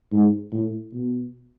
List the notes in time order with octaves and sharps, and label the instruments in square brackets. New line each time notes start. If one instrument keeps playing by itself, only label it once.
[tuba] G#2
A2
B2